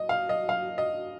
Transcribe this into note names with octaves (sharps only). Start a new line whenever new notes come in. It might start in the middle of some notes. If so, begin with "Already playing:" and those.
Already playing: D#5
F5
D#5
F5
D#5